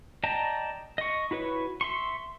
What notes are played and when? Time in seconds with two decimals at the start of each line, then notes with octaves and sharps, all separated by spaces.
0.23 D5 D#5 G5 A5 A#5
0.98 D#5 C#6
1.31 E4 F#4 B4 C#5
1.81 E5 C6 C#6